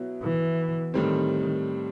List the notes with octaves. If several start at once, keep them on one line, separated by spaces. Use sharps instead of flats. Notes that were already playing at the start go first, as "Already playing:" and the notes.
Already playing: B2 F#3 B3 E4
E3
A2 D#3 G3 C4